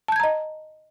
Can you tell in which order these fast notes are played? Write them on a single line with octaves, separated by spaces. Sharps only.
A5 G6 G#6 A#5 D#5